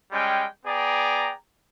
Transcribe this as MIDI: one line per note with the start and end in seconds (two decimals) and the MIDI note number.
0.12 0.45 55
0.12 0.45 56
0.12 0.45 61
0.12 0.45 79
0.65 1.31 59
0.65 1.31 68
0.65 1.31 74
0.65 1.31 79
0.65 1.31 82